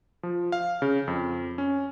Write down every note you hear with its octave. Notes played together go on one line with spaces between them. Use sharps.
F3
F5
C#3
F2
C#4